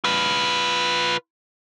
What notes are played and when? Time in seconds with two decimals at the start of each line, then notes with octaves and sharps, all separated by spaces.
0.04 F4 B4